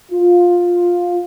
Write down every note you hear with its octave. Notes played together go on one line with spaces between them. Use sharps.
F4